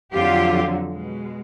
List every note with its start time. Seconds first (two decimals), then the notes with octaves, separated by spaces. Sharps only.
0.13 F2 D3 F#3 F4 G4
0.89 B2 G#3